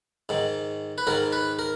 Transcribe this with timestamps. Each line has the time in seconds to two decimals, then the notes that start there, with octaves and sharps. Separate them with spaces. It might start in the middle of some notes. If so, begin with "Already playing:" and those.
0.29 G#2 D#3
0.98 B4
1.07 G#2 D#3 A#4
1.32 B4
1.59 A#4